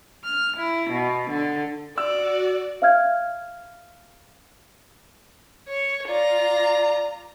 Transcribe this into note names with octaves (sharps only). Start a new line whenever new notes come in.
F6
E4
B2
D3
F#4 D5 E6
E5 F5 F6 G#6
C#5
F4 D5 A#5